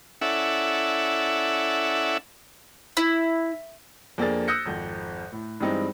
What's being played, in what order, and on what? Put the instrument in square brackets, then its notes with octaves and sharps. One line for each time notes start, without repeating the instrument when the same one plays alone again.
[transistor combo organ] C#4 E4 A4 D5 E5 F#5
[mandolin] E4
[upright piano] F2 A#3 D4 G#4 A6
D#6 E6 F#6 G6 A#6 C#7
G#1 F2
A2
G2 E3 G3 G#3 C4 D#4